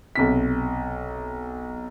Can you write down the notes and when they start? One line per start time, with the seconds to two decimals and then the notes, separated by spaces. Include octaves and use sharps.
0.16 B1 C3 B6